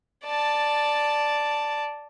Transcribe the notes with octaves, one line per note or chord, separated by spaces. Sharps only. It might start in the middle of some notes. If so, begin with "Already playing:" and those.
D5 A5